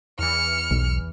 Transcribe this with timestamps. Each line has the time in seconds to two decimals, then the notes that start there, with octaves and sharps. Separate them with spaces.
0.19 E2 E3 F6 C#7
0.71 B1